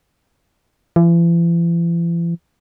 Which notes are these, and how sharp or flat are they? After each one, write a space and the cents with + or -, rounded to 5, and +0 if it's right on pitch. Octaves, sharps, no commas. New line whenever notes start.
E3 +45